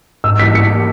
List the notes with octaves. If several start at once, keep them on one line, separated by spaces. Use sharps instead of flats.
G#2 E6
E3 G3 A#3 B6
G#2 C#7
E3 G3 A#3